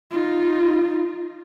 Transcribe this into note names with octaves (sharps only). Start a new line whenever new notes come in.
D#4 F4